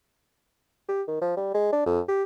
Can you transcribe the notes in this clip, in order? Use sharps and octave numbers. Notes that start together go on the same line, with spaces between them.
G4
D#3
F3
G3
G#3
D4
F2
G4